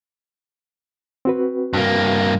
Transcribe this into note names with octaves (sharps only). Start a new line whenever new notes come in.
C4 F#4 B4
G2 A#3